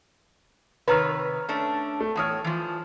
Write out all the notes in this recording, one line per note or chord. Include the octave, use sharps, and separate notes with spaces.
C3 D#3 B4 C#5 A#5 F6
A3 C#4 D4
A3
E2 A2 C#5 A5 D#6 F6
E3 F3